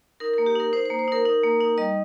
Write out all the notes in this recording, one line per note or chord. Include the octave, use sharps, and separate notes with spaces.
D#4 A#4
A#3 A#4
G4
D#4 A#4
D#4 C5
A#3 C5
C5
D#4 A#4
D#4
A#3
D#4
G3 D#5